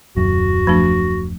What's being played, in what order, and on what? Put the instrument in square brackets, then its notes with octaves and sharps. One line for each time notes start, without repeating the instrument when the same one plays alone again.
[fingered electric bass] D#1 F#2 [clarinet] F#4
[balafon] F3 A3 D4